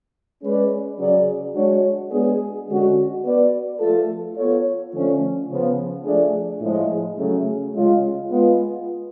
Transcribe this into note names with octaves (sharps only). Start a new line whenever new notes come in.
G#3 C#4 G#4 B4 D5
C#3 F#3 C#4 G#4 D5
G#3 D4 F#4 C#5
G#3 B3 D4 G#4
D3 G#3 C#4 F#4
B3 F#4 B4 D5
F3 A3 F4 A4
B3 F4 A4 C#5
D3 F3 A3 C#4
C#3 F3 B3
F3 A3 D4 G#4 D5
A2 F3 G#3
C#3 F#3 A3 C#4 G#4
C#3 G#3 C#4 F4
G#3 B3 F4